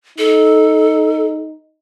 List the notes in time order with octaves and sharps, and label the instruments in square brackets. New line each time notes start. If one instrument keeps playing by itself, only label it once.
[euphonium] D#4 [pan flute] A4